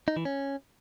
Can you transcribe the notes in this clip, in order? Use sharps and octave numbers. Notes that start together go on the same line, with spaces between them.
D#4
E3
C#4